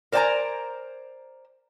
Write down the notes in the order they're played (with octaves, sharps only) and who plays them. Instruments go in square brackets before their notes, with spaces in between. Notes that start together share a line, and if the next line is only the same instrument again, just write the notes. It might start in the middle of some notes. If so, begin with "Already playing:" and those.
[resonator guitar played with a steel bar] A#4 C5 D5 G5 G#5 A#5